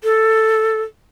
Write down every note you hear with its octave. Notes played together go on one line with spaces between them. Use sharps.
A4